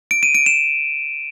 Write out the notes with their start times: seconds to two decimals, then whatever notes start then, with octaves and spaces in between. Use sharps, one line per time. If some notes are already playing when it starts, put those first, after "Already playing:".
0.11 D7
0.23 D#7
0.35 D7
0.46 E7